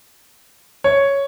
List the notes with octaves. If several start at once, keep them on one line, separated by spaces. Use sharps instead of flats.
C#5